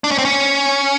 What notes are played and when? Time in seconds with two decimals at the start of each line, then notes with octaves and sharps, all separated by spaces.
0.04 D4
0.11 C#4
0.18 C4
0.25 C#4